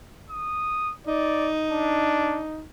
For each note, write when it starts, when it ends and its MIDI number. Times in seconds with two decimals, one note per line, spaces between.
0.30 0.93 87
1.07 2.64 63
1.07 1.50 74
1.71 2.42 62